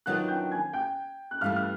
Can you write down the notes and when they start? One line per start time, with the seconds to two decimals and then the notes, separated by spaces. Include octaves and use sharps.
0.06 D#3 F#3 B3 D4 F4 F#5 F#6
0.28 G5 G6
0.52 G#5 G#6
0.73 G5 G6
1.31 F#6
1.41 G2 E3 A3 F5 F6
1.56 F6